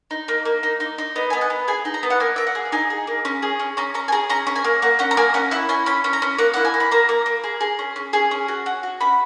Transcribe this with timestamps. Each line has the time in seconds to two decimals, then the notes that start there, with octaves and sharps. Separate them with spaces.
0.11 D#4
0.28 A#3
0.45 A#3
0.63 D#4
0.80 D#4
0.98 D#4
1.16 B3 D#5
1.30 B3 G#5
1.41 F#5
1.50 B3
1.68 G#4 G#5
1.85 D#4
1.94 A#5
2.03 B3
2.10 F#5
2.20 A#3 G#5
2.36 A#3 E5
2.47 F#5
2.55 G#4
2.72 D#4 G#5
2.90 G#4
3.07 A#3
3.25 C#4
3.42 G#4
3.59 C#4
3.77 C#4 A#5
3.94 C#4 A#5
4.08 G#5
4.12 G#4 A#5
4.29 C#4 A#5
4.47 C#4
4.56 G#5
4.64 A#3
4.82 A#3 F#5
4.99 C#4 F#5
5.11 A#5
5.17 A#3 G#5
5.34 C#4 F#5
5.51 E4 F#5
5.69 C#4 G#5
5.86 C#4 B5
6.04 C#4
6.13 A#5
6.22 C#4
6.38 A#3 F#5
6.54 E4 F#5
6.65 G#5
6.74 A#3
6.80 B5
6.91 A#3 A#5
7.09 A#3
7.26 A#3
7.44 G#4
7.61 G#4
7.79 C#4
7.96 C#4
8.13 G#4
8.31 C#4
8.48 F#4
8.66 F#4
8.83 F#4
9.01 C#4 B5